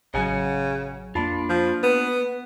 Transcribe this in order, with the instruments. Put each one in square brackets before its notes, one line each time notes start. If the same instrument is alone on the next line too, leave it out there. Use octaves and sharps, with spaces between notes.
[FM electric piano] A1 F#3 [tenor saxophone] C#3 [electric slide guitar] D#5 F#5 G#5
[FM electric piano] F2 A5 B5 [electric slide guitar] A#3 D4 F4
[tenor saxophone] F3
[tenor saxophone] B3 [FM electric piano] B4